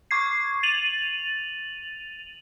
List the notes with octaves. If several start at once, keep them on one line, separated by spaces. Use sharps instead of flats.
C#6 D6 G#6 C7
A6 D#7 F7 F#7